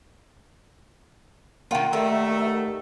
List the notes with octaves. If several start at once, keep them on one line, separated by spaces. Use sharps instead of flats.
D#3 A#3 F4 F#5 G5
D#3 G3 A3 A#4 E5